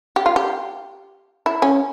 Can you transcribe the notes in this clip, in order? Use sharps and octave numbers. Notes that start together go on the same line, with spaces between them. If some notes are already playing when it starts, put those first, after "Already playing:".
G4
F4
G4
E4
C#4